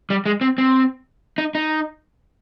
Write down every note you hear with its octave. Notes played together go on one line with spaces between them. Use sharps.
G3
G#3
C4
C4
D#4
D#4